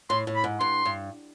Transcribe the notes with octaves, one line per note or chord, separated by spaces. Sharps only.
A2 C6
A2
B5
G#2
G2 C6
G2